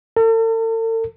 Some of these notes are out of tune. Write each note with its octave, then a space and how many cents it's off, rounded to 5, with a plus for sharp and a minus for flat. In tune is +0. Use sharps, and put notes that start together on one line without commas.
A4 +45